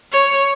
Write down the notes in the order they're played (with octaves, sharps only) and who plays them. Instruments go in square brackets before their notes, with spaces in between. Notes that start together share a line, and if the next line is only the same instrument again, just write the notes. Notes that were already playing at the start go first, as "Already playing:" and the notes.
[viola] C#5